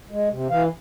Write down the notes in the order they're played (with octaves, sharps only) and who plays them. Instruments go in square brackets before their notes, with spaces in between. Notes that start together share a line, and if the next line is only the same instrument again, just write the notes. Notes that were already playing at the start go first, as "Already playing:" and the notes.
[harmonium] G#3
C3
E3 F5